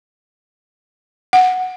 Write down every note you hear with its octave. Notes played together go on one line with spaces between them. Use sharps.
F#5